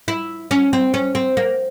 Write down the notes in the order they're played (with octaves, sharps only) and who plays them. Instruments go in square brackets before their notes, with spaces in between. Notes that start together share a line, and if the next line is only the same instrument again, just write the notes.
[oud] E4
C#4
C4
C#4
C4
A#3